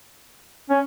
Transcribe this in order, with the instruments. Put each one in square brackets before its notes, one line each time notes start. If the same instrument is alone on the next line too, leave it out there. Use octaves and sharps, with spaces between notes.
[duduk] C#4